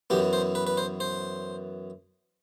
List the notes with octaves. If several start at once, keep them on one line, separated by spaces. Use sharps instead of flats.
F#2 E3 B3 G4
C5
B4
B4
C5
C5